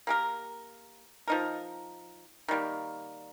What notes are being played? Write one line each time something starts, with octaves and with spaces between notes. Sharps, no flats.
A#3 G4 A#4
F3 D#4 A#4
D#3 G3 A#3